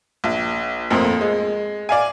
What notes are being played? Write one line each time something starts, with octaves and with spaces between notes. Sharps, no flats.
A#1
F2 A2 A#3 C4
G#3
D5 F5 G#5